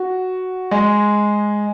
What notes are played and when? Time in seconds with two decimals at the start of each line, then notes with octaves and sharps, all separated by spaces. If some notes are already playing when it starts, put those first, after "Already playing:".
Already playing: F#4
0.71 G#3